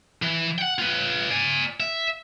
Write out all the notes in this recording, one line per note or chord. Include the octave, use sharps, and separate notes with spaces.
E3
F#5 G5
F4 B4
D5 G#5
E5